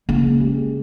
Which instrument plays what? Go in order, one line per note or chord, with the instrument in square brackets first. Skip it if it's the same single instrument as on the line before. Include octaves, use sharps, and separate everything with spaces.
[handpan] C#3 [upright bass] A#3
[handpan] G#3 C#4 G4